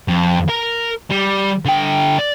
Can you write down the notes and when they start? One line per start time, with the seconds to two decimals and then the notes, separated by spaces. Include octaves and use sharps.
0.08 F2
0.49 A#4 A#5
1.11 G3
1.66 D3 G5
2.18 D5